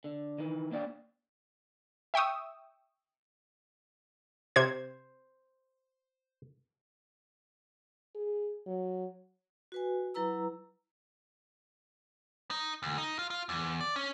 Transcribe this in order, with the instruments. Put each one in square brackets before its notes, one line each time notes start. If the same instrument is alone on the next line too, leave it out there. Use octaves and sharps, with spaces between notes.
[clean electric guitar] D3
D#3 E3
A#3 D4 D5 F#5 G5
[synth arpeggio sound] E5 G5 C#6 D#6 E6
[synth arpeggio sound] C3 G#6 [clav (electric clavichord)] C5
[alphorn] G#4
F#3
[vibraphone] F#4 B4 G#5
F#3 E4 B4 A#5 E6
[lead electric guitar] D#4
D2
D#4
F4
F4
E2
D5
C#4